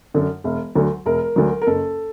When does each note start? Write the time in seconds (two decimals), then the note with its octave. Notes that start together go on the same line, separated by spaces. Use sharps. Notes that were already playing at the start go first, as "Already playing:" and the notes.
0.14 F#2 D3
0.44 E1
0.75 D2 D3 F#3
1.06 E1 A#4
1.36 D2 D3 F#3
1.62 A#4
1.67 F#1 A4